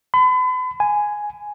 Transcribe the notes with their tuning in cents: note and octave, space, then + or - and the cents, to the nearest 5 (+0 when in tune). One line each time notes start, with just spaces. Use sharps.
B5 +40
G#5 +5